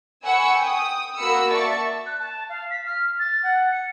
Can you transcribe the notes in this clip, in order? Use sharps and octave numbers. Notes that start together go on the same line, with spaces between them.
F#5 G#5 B5 C#6 E6
G5 D#6
A#3 F#4 F#5 B5 E6 C#7
D5 E5 A5 C#6 A6
F#6
A5
F5
B6
F6
A6
F#5
C#7